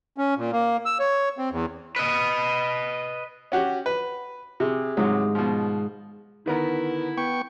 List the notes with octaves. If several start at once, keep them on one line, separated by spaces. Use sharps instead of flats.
C#4
A#2
A#3
E6
C#5
C4
E2
B4 D#5
C#4 F#4 G4
B4
C3 G4 G#4
G#2 C3 D#3 F#3 D#4
B2 F3
D3 D#3 B3 E4 A#4
B3 G5 C#6